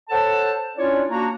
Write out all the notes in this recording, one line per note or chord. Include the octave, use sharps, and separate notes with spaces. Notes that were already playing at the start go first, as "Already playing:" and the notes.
A4 C5 C#5 F#5 A5
C#4 D4 E4 F4 C#5 D5
A#3 D4 F#4 A#5